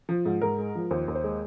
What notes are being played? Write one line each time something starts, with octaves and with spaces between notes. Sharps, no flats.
F3
G#2
G#2 A#4
G#3
F3
D#2 C5
D#2
C5
G#3